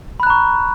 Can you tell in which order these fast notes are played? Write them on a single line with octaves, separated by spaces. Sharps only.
B5 F#6 A#5 C#6